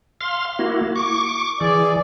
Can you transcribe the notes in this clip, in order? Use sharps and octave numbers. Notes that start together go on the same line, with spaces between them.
F5 C6
A#3 E4 F#4
C#6 D6
E3 G#4 D5